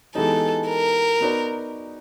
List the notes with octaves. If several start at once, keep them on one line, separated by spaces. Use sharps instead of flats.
E3 G#3 B3 D#4 G4 A4
A#4
B3 D#4 F#4 B4 D5